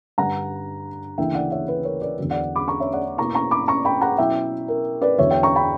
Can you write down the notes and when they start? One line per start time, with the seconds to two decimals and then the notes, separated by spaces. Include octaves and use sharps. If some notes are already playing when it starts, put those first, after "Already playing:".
0.18 G2 D3 G3 F#5 A#5
1.18 D2 C#3 E3 A#3 E4 E5 G5
1.35 D5 F#5
1.51 C#5 E5
1.68 B4
1.84 A#4 C#5
2.01 B4 D5
2.18 E2 D3 F#3
2.30 D5 F#5
2.55 B5 D6
2.68 A#5 C#6
2.80 C#5 E5
2.93 D5 F#5
3.18 B2 A#3 E4 A#5 C#6
3.35 A#5 C#6
3.51 B5 D6
3.68 A#5 C#6
3.85 G5 B5
4.01 F#5 A#5
4.18 B2 F#3 C#4 E4 E5 G5
4.68 A#4
5.01 B4 D5
5.18 E2 D3 F#3 C#5 E5
5.31 E5 G5
5.43 A#5 C#6
5.56 G5 B5